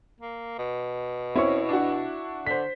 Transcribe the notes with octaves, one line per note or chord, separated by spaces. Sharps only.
A#3
B2
C4 C#4 E4 C#6
D4 F#4
D3 C5 B6